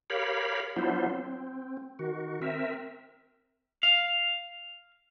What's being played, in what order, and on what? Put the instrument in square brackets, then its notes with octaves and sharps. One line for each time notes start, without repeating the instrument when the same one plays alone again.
[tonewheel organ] G4 A#4 C#5 F5 B5
F#3 B3 D4 E4 F4 C5
C4
D#3 F#4
C4 A#4 E5
[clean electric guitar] F5